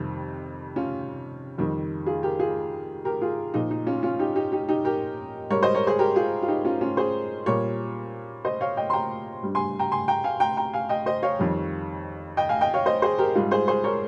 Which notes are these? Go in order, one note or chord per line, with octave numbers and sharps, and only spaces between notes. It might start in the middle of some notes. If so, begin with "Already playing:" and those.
Already playing: F2 C3 D#3 G3
C#4 F4
F2 D#3 G3
F4 G#4
G4 A#4
F4 G#4
G4 A#4
F4 G#4
A#2 F3 D#4
D#4
C#4 F4
C#4 F4
D#4 G4
D#4 G4
D#4 G4
D#4 G4
G4 A#4
G#2 G3 A#4 C#5
C5 D#5
A#4 C#5
G#4 C5
G4 A#4
F4 G#4
F4
D#4 G4
C#4 F4
C#4 F4
G#4 C5
A#2 G3 A#4 C#5
C5 D#5
C#5 F5
D#5 G5
C6
G5 A#5
G2 G3
G#5 C6
G5 A#5
G#5 C6
G5 A#5
F5 G#5
G5 A#5
G5 A#5
F5 G#5
D#5 G5
C5 D#5
C#5 F5
F2 D#3 G3
D#5 G5
F5 G#5
D#5 G5
C#5 F5
C5 D#5
G#4 C5
G4 A#4
G#2 G3 F4 G#4
G#4 C5
G#4 C5
A#4 C#5